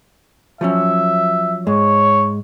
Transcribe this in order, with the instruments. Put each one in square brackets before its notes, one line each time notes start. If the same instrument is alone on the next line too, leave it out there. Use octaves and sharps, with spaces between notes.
[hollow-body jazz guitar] F3 F#3 C#4 [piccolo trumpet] E5
[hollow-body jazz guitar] G#2 G#3 [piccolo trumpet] C#5